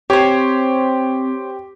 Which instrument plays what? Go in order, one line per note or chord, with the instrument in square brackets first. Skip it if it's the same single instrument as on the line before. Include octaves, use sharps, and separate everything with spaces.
[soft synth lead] C4 [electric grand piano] G4 [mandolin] C5 C#5